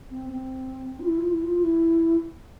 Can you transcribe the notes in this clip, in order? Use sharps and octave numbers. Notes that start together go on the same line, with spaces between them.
C4
C4
F4
E4
F4
E4
F4
E4